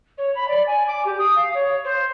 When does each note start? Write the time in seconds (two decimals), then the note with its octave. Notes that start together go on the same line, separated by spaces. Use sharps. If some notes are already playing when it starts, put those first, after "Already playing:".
0.17 C#5
0.35 B5
0.48 D5
0.66 G#5
0.87 D6
1.05 G4
1.18 D#6
1.35 F5
1.53 C#5
1.84 C5